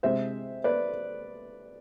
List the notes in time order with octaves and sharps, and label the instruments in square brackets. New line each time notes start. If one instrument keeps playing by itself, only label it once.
[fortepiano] C3 G#3 C4 C5 E5
B4 D5